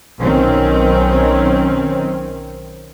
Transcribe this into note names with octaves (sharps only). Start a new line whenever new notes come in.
B1 D#3 C4 C#4